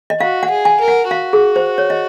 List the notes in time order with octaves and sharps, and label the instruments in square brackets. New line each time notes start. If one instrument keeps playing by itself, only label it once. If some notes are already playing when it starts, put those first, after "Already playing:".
[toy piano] D#5
[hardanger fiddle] F#4 [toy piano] F5
[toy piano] F#5
[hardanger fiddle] G#4
[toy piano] G#5
[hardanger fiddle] A#4
[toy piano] F#5
[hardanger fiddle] F#4 [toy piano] F5
[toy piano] G#4
C5
C#5
D#5